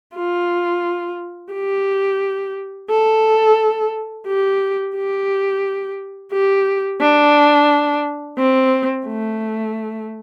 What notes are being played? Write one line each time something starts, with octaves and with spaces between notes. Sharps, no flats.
F4
G4
A4
G4
G4
G4
D4
C4
A3